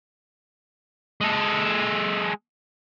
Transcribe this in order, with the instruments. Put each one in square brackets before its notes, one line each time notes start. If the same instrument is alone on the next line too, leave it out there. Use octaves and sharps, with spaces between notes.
[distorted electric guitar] G#3 A4